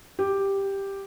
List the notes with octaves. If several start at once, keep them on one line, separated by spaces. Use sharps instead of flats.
G4